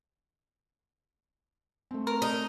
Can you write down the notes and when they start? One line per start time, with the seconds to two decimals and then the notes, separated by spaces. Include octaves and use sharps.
1.91 A3 C4
2.07 A#4
2.22 D#4